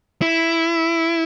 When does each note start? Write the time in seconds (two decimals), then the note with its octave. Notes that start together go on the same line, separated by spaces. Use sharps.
0.22 E4